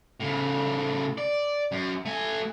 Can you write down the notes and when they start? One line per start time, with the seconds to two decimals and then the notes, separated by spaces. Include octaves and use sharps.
0.20 A2 C#3
1.18 D5
1.72 F#2
2.06 A3 G#5